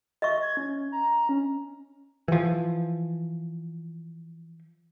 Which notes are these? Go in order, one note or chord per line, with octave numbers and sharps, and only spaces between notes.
D#5 E5 C#6
G#6
C#4
A#5
C#4
E3 F3